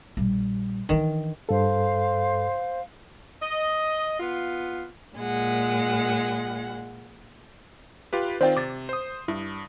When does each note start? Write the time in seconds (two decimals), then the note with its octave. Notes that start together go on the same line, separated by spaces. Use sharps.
0.17 A#1 G3
0.89 D#3 E3 D4
1.49 G2 A4 C5 F5
3.41 D#5
4.20 B3 F4
5.17 A#2 G#3 F#5
8.13 F4 G4 B4
8.41 D#3 C4 F4 C5 D5 G5
8.57 C3 D6 A6
8.89 C5 D#6
9.28 G2 E4